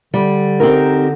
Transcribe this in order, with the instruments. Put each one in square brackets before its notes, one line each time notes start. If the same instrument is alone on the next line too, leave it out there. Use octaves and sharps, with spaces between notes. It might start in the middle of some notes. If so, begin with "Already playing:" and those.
[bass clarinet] D3 [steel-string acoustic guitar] G3
[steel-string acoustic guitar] C4 D#4 G4 A#4